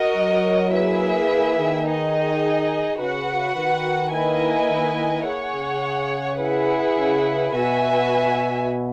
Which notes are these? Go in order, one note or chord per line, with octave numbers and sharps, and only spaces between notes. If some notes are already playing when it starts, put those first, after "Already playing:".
Already playing: F#4 A#4 D#5
F#3
A#3 E4 G#4 B4 E5
E3
D#3
D#4 G#4 D#5
C#3 F#4 B4 F#5
D#3
A#3 E4 B4 D#5 G#5
D#3
G#4 C#5 F#5
C#3
E4 G#4 B4 F#5
C#3
B2 F#4 B4 E5 G#5